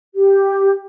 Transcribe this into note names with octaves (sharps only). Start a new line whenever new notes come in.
G4